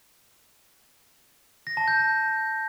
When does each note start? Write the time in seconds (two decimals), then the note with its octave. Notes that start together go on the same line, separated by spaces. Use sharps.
1.67 A#6
1.77 A5
1.88 G6